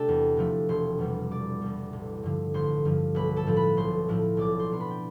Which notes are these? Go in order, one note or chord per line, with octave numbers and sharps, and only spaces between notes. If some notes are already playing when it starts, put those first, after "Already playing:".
Already playing: C3 A3 D4 G4 A4 D5 G5 A5
E2
C3 F3 A3
E1 C5 C6
E2 B2 G3
E1 D5 D6
E2 B2 G3
A1
G2 D3 F3
A1 C5 C6
G2 D3 F3
B1 B4 B5
A4 A5
A2 F3 C4 E4
B4 B5
B1 C5 C6
A2 F3 C4 E4
B1 D5 D6
C5 C6
B2 B3 D4 C6
B4 B5
G5